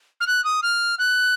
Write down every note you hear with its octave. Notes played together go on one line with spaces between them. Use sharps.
F6
F#6
D#6
F6
F#6